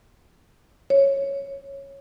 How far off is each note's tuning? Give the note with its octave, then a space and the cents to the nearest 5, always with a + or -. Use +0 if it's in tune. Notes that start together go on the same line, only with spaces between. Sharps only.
C#5 -5